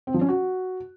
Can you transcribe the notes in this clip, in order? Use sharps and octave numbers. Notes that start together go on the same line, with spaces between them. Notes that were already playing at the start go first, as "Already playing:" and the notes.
C4
F3
C#4
F#4